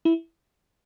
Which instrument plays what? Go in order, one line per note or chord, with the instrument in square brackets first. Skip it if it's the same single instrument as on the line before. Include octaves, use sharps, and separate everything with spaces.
[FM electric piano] E4